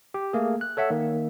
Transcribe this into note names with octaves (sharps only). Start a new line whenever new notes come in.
G4
A3 A#3 G#4
F#6
A4 C#5 E5 F#5
D#3 A#3